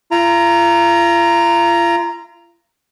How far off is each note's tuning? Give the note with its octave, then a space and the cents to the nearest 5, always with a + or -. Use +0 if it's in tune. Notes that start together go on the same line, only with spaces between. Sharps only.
F4 -40 A#5 +0